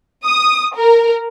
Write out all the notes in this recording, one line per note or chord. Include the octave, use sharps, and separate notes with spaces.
D#6
A#4